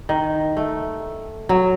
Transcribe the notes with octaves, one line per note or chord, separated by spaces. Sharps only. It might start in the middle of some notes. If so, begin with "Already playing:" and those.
D#3
A3
F#3